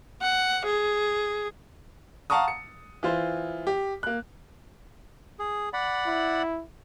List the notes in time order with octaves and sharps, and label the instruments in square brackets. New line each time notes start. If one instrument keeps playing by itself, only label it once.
[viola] F#5
G#4
[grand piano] F5 F#5 A5 A#5 C#6 D#6
C#7
E3 F4 C5
G4
A#3 F#6
[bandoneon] G#4
D5 F#5 B5
[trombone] E4